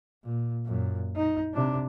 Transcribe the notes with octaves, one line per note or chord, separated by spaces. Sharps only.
A#2
F#2 A#2
D#4
C3 D4